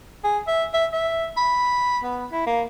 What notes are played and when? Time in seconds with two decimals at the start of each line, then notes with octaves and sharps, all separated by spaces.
0.24 G#4
0.47 E5
0.74 E5
0.93 E5
1.37 B5
2.04 B3
2.32 E4
2.47 A#3